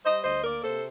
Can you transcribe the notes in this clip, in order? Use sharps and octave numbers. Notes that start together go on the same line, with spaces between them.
G3 C5 D#5
D2 C5 D#5
A#3 A#4 D5
C3 A4 C5